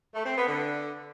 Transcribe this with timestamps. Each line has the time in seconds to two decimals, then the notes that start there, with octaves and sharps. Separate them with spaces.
0.14 A3
0.25 C4
0.36 B3
0.47 D3